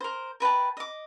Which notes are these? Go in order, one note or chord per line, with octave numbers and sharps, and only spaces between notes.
A#4 C5
A#4 B4 G5 A5
D#5 D6